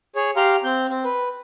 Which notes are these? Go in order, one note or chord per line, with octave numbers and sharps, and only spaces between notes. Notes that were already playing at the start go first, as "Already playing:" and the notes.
G#4 C#5
G4 F5 A#5 C6
C4 G6
C4
B4